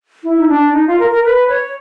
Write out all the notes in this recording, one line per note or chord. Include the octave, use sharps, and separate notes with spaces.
E4
D#4
D4
D#4
F4
A#4
A#4
B4
C#5